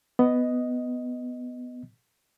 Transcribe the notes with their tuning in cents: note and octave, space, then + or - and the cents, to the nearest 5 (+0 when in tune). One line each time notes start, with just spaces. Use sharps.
B3 +10 D#5 +0